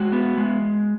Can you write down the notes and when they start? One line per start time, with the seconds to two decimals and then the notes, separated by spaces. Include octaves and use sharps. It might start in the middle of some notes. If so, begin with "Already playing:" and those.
Already playing: G#3 F#4
0.12 B3
0.37 G#3